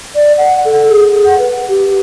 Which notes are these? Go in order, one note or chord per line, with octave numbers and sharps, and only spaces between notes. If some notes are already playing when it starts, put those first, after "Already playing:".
D5
F#5
A4
G#4
F#5
B4
G4